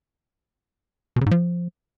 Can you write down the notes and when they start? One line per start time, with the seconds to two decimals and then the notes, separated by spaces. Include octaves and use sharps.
1.16 B2
1.21 C#3
1.26 G#2
1.31 F3